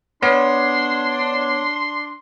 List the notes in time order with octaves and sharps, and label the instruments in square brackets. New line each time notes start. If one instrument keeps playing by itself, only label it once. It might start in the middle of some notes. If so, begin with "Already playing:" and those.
[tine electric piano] B3 [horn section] D4 [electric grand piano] C#5 [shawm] C6